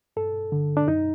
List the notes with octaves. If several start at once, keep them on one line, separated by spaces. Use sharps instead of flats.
G2 A4
D3
D4
F#2 D#4